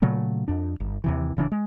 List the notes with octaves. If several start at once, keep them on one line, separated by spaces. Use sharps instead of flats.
A#2 C#3 F#3 A3
F2 D4
G1
D#2 C3 E3
D1 C#3 E3 D4
G#3